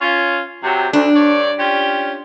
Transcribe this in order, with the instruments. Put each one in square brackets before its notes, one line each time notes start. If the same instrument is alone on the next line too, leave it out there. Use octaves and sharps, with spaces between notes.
[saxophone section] C#4 F4
C3 F#3
[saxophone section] D2 [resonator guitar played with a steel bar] D4
[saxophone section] G2 C#5 D5
C#4 F4 G4